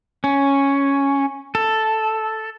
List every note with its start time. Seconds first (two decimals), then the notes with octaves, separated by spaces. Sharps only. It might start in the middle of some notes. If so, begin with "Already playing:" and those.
0.24 C#4
1.55 A4